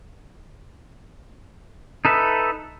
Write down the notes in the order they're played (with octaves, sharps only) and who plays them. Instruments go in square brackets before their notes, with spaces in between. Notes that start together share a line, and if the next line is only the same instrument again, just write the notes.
[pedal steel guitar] D#4 A4 B4 E5